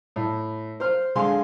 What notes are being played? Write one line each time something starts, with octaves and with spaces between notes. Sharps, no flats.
A2
C5 F6
D3 G#3 F5 G#5 C6